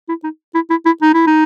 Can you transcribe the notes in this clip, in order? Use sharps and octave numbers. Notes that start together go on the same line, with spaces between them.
E4
D#4
E4
E4
E4
D#4
E4
D#4